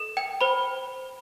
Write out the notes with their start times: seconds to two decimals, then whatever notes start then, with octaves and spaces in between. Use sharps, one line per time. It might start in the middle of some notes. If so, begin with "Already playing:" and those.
Already playing: A4
0.17 G5
0.41 C5 B5